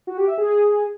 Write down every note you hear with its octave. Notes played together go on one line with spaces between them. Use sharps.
F#4
G4
E5
G#4